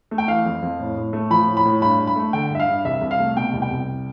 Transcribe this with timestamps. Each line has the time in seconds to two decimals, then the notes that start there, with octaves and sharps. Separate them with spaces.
0.11 A3
0.18 G5
0.28 E3 F5
0.45 F2
0.62 F2
0.80 A2
0.97 A2
1.13 A3
1.31 F3 B5
1.48 A2
1.57 B5
1.65 A2
1.82 G2 B5
1.99 G2
2.07 B5
2.16 A3
2.33 D3 G5
2.50 G2 E5
2.60 F5
2.68 G2
2.85 C2 E5
3.01 C2
3.11 F5
3.19 A3
3.37 B2 G5
3.53 C2
3.62 G5
3.71 C2